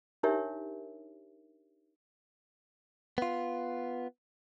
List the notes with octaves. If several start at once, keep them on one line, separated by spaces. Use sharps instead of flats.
D4 D#4 G4 A#4 C#5 E5
B3 F4